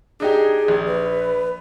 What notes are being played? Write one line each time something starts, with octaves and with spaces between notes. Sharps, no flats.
D4 D#4 G4 G#4
A#1
B4